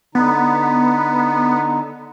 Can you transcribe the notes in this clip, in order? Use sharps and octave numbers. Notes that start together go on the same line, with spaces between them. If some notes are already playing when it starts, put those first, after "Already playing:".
D3 B3 D#4